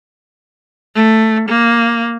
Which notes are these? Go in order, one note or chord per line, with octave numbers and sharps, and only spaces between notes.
A3
A#3